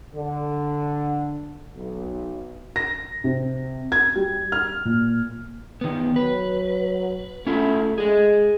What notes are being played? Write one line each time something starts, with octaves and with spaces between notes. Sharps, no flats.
D3
B1
A#6
C3
G#6
G3
F6
A#2
D#3 B3
F#3 B4
A3 C#4 E4 F4
G#3 G#4 D#5